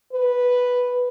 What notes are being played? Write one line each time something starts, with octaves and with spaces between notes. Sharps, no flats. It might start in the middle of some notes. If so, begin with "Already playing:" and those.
B4